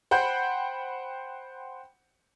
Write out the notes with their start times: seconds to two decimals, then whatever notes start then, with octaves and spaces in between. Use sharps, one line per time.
0.11 C5 F#5 G5 B5 G6